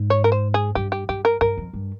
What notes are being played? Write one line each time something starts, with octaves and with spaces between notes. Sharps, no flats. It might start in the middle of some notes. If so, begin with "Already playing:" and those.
Already playing: G#2
C#5
A#4
C5
G#4
G2 G4
G4
G2 G4
A#4
G2 A#4
F2
G2